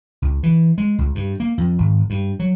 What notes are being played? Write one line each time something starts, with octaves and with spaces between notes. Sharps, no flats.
C#2
E3
G#3
C#2
G2
A#3
F2
G#1
G2
F#3